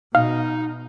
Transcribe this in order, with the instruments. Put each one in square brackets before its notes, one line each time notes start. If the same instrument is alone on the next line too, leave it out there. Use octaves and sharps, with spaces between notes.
[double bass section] B2 [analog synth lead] D#4 [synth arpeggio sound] F5